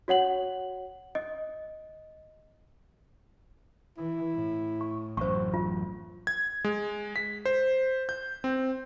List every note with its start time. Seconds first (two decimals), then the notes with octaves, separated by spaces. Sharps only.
0.08 F#4 C#5 F#5 F#7
1.15 D#5
3.98 E3 E4
4.33 A2
4.81 C#6
5.17 A1 F#2 C5 C#6
5.54 F4
6.27 G#6
6.64 G#3
7.16 B6
7.45 C5
8.09 G6
8.44 C4